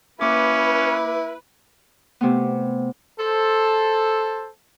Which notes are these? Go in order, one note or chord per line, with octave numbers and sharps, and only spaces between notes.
A#3 C#4 E4 B4 D6
C3 A3 B3
A4 C5